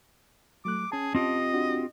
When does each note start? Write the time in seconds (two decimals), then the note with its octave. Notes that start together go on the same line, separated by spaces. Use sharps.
0.65 F#3 A3 D6 F#6
0.92 C#4 G#4 A5
1.15 C4 F4 G4 D#5
1.54 D4 F#4